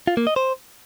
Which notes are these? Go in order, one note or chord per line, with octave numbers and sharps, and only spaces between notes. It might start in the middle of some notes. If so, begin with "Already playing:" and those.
F4
A#3
D#5
C5